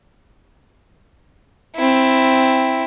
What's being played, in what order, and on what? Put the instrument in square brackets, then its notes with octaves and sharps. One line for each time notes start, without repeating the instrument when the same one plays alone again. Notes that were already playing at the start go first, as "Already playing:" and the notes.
[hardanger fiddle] C4 E4